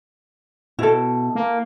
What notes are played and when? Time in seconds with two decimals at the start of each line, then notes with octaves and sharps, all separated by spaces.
0.79 B2 E4 A4
1.35 A#3